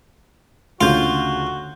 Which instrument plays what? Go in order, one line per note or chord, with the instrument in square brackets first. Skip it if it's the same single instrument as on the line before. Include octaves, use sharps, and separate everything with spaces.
[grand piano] D2 C#3 G6 [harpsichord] F4 [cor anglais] F#4